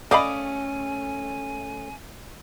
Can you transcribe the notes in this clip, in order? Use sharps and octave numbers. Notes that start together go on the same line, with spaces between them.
A3 C#4 C5 D5 D#5 F5 G#5 B5